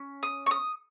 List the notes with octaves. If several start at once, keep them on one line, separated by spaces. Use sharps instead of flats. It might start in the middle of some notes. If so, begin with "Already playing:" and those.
Already playing: C#4
D#6
C#6
D#6